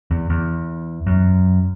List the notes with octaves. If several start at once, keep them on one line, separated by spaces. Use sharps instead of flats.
E2
E2
F#2